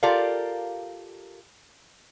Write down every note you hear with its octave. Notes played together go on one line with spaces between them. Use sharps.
F4 G4 A4 A#4 D5 F5